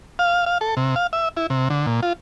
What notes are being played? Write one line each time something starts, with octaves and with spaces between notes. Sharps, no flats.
F5
F5
A4
C3
F5
E5
E4
C3
D3
A#2
F4